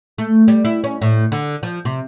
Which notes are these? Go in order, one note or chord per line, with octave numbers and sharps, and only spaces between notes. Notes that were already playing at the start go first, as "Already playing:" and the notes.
A3
G3
E4
C#4
A2
D3
F3
C3